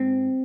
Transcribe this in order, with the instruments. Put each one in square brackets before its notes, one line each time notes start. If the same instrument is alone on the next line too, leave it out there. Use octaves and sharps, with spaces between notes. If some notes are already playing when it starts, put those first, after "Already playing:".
Already playing: [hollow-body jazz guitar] G#2 C4